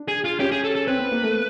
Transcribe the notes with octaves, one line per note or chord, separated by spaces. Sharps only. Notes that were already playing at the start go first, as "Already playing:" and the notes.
Already playing: D4
G#4
F4
C#4 G4
G#4
A4
A4
C4 B4
B3
A#3
A3